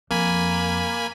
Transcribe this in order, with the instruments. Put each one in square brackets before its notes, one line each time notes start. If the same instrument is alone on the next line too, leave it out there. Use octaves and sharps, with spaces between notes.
[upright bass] F2 [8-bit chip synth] A#3 G#5 B5